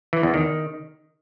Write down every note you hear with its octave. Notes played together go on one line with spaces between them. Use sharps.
E3
E2
D#3